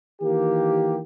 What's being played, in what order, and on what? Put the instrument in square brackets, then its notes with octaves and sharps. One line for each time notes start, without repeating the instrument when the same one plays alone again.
[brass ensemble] D#3 E3 A#3 G4